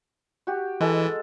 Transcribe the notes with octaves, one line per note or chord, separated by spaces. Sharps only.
F#4 G4
E3 G#3 A4